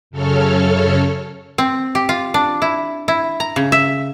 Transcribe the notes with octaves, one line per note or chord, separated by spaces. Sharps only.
F#2 C#3 A4 C#5 F6
C4
G4
F4
D4
E4
E4
A#5
C#3
E5